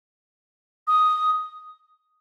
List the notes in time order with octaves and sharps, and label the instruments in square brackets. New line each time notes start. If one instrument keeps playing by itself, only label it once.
[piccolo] D#6